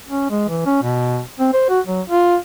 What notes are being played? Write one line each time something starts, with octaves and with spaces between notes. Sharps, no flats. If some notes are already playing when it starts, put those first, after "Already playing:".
C#4
G#3
E3
C#4
B2
C4
C5
F#4
F#3
F4